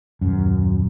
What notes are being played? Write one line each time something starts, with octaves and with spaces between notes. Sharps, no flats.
D#1 F#2